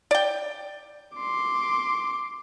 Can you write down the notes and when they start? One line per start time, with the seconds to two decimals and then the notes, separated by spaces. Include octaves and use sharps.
0.11 D5 G5
1.17 C6 D6